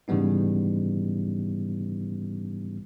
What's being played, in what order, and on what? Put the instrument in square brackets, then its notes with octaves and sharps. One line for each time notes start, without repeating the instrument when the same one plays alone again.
[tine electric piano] G#2 C#3 E3 G3 B3 D#4